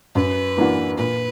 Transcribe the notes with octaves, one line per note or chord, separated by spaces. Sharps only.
F#2 B4
E3 A#3 D4 F#4
A#2 B4